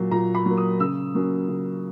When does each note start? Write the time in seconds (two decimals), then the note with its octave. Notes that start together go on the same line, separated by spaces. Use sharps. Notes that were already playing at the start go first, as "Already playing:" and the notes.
Already playing: A#2 F#3 A#3
0.11 A#2 A#5
0.35 B5
0.46 F#3 A#3
0.57 D#6
0.80 C#3 E6
1.15 F#3 A#3 C#4
1.49 C#3